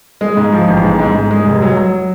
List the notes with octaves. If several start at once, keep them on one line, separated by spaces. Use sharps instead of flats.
G#3
G#2
F3
A1
G#2
G#2
G#2
G#3
F1
F#3
F#3